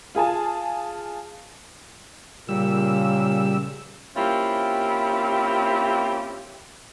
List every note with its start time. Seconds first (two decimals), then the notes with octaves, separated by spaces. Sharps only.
0.15 F4 G#4 G#5 A5
2.49 A#2 C#3 G3 E6
4.17 A#3 C4 C#4 E4 F4 G4